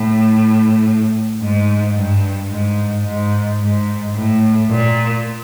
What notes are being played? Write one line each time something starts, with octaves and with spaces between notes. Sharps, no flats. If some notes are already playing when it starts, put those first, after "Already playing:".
Already playing: A2
G#2
G2
G#2
G#2
G#2
A2
A#2